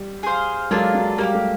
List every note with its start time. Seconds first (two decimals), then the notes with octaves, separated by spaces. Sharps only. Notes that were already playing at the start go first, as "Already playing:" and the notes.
Already playing: G3
0.23 G#4 C5 F5
0.71 F#3 G#3 A#3 D4 F4 A4
0.95 F#3
1.18 G3 A#3 D#4
1.23 G4
1.34 G3 A3